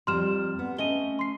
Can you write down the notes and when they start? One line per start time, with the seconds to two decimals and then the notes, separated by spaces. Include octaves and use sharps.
0.07 F2 G3 A#5 C6 F6 E7
0.59 B3
0.78 A3 C#4 D#5 D#7 G7
1.19 C6 C7